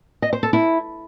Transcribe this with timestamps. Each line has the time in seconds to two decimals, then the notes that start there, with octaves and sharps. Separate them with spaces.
0.22 D#5
0.33 C5
0.43 A4
0.53 E4